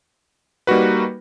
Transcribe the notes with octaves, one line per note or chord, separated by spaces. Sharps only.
G3 A#3 D#4 F#4 B4